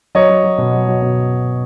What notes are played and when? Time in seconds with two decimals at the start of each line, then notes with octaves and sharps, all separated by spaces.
0.15 F#3 C#5 D#5
0.29 F#3
0.44 F#3
0.58 B2
0.73 F#3
0.87 F#3
1.02 B2